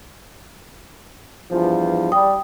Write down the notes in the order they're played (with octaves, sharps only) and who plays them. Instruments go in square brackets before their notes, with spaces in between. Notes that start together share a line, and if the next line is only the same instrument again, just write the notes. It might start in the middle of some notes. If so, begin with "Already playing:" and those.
[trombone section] E2 G2 F3
[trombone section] G3 [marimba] G5 D#6